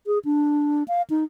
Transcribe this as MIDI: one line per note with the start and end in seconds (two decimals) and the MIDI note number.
0.07 0.19 68
0.25 0.83 62
0.88 1.02 77
1.10 1.24 63